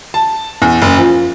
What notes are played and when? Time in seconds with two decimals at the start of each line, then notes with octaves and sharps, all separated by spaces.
0.14 A5
0.62 E2
0.82 F#1
0.98 F3